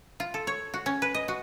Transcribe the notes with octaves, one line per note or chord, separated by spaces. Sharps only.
F4
A4
C#5
F#4
C#4
B4
D#5
F#4